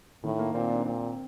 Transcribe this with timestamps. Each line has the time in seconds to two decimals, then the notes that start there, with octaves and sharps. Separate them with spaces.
0.24 A2 D#3
0.39 A#3
0.54 A#2 C4
0.70 D4
0.85 A#2 C4